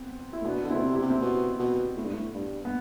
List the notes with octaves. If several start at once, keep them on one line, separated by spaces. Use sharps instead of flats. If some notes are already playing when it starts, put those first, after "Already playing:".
Already playing: B3 C4
E4
A2
B2 B3 D4
D3
C4 E4
B2
C3
E4 G4
C3
C4
B2 B3
B2
A2
G2
A2
G2
B3